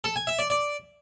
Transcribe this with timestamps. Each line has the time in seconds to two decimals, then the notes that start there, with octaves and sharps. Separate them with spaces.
0.04 A4
0.16 G#5
0.27 E5
0.39 D5
0.50 D5